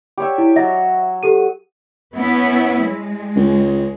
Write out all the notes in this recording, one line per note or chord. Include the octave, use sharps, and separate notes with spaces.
G4 C#5 E5
E4
F#3 D#5 E5 A#6
G4 A4 D#7
B3 C#4 E4
G#3
C#2